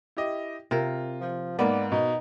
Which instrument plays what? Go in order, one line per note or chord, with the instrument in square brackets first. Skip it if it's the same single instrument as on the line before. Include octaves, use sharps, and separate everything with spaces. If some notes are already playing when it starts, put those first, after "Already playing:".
[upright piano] E4 G4 D#5
[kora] C3 A#4 [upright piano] F4
[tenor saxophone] F3
[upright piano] G#2 [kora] A#3 B3 [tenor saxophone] D5
[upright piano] B2 [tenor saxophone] D#4